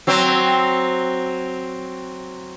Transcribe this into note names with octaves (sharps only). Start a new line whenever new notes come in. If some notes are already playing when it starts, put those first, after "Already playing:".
F#3 C4